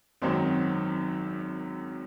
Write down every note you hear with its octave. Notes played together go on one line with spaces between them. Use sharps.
G#1 F#2 D#3 F#3 C4 C5